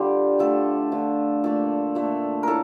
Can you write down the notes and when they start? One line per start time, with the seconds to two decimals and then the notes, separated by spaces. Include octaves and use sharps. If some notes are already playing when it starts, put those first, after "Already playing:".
Already playing: D3 G3 F4 G4
0.39 D3 F3 A3 A4
0.92 D3 F3 A3
1.44 A#2 A3 A4
1.95 A#2 A3
2.43 A2 A4 A#4